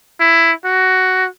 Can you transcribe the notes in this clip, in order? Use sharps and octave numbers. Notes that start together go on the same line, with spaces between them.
E4
F#4